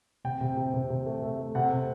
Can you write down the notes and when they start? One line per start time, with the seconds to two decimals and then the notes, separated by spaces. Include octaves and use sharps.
0.24 C3 G5
0.41 C3
0.57 C3
0.74 C3
0.90 C3
1.06 A3
1.23 A3
1.39 A3
1.55 C3 F#5
1.71 C3